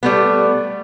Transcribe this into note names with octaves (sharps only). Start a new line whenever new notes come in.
G3 A3 B3